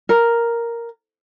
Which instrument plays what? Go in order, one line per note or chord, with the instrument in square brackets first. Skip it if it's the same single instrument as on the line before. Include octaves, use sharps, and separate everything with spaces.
[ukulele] A#4